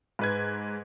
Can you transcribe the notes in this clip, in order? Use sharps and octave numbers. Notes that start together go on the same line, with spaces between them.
G#2 B4 G#6